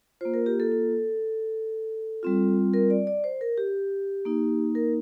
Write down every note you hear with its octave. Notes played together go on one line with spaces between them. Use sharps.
A#3 F4 C5
A#4
G4
A4
A4
G3 C4 F4
A#4
D5
D5
C5
A#4
G4
A#3 D#4
A#4